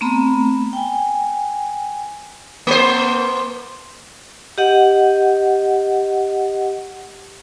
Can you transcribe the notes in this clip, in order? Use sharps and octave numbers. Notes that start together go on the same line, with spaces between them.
A3 B3 C4 A#5 B5
G5 G#5
A#3 C5
G4 D#5 F#5